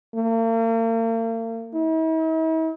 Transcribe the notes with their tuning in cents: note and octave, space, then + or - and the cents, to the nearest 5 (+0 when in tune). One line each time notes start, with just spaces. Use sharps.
A#3 -45
E4 -45